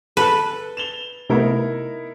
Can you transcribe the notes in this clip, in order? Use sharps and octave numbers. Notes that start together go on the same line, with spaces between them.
A4 B4
E7 F7 G7
C3 A3 B3 D#4 E4 A#4